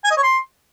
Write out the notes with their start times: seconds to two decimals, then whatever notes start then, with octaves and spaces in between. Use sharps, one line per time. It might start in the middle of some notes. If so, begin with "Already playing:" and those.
0.04 G#5
0.10 D#5
0.17 C#5
0.23 C6